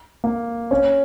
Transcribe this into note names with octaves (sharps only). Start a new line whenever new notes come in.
A#3
C#4